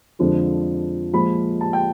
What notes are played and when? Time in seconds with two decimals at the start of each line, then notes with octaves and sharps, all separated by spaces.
0.19 F2 D3 F3 G#3
1.13 A#2 F3 G#3 B5
1.61 A5
1.73 G5